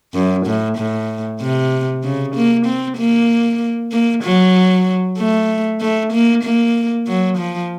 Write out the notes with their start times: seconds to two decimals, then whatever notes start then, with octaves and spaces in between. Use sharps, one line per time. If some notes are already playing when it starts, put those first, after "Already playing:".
0.14 F#2
0.46 A2
0.78 A2
1.41 C3
2.03 C#3
2.35 A#3
2.66 C4
2.98 A#3
3.92 A#3
4.23 F#3
5.18 A3
5.81 A3
6.12 A#3
6.43 A#3
7.07 F#3
7.38 F3